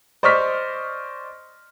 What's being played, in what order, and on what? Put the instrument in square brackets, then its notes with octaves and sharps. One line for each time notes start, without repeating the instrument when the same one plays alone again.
[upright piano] C5 D5 D#5 C#6 F6 B6